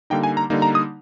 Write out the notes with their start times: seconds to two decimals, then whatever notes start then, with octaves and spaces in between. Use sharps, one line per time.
0.10 D3 G3 A#3 D#4 G5
0.23 G#5
0.37 A#5
0.50 D3 G3 A#3 D#4
0.62 A#5
0.75 D#6